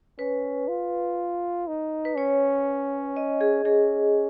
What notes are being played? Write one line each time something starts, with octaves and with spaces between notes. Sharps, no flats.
C#4 B4
F4
D#4
B4
C#4 C#5
D#5
G#4
C#4 G#4